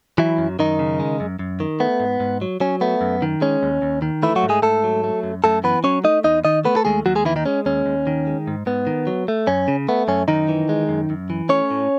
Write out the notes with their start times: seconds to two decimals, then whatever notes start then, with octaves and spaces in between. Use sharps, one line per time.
0.18 E3 F#3 E4
0.38 F#2
0.59 F#2 D#3 D#4
0.79 C#3
1.00 G#3
1.20 F#2
1.39 F#2
1.60 D#3
1.80 A3 B3
2.00 G#2
2.20 G#2
2.42 F#3
2.60 F#3 C#4
2.81 A3 B3
3.01 F#2
3.22 D#3
3.41 G#3 C#4
3.63 D#2
3.82 D#2
4.02 D#3
4.23 E3 A3 E4
4.36 F#3 F#4
4.43 G#2
4.49 G#3 G#4
4.62 G#2 A3 A4
4.84 F#3
5.04 A3
5.23 F#2
5.44 F#2 A3 A4
5.64 E3 B3 B4
5.84 F#3 C#4 C#5
6.04 A3 D#4 D#5
6.24 E2 D#4 D#5
6.45 D#3 D#4 D#5
6.65 A3 B3 B4
6.76 A4
6.85 D#2 G#3 G#4
7.06 D#2 F#3 F#4
7.15 G#3 G#4
7.25 D#3 E3 E4
7.36 D#3 D#4
7.46 G#3 C#4
7.66 D#2 C#4
7.86 D#2
8.07 D#3
8.27 G#3
8.48 G#2
8.66 G#2 B3
8.87 D#3
9.07 F#3
9.28 A3
9.47 F#2 C#4
9.68 C#3
9.88 A3 B3
10.08 F#2 C#4
10.28 F#2 D#3 D#4
10.48 E3
10.69 G#3
10.89 F#2
11.10 F#2
11.30 E3
11.49 A3 C#4 C#5
11.71 A2